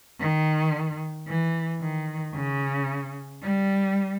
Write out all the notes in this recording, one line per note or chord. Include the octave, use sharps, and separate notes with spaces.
D#3
E3
D#3
C#3
G3